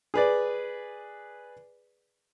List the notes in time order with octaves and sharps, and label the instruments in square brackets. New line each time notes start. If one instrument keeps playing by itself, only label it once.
[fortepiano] G#4 B4 D5